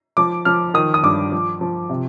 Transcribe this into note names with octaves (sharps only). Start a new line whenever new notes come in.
F3 D6
F3 F6
D#3 D#6
D#6
G2 D6
F3
F3
C3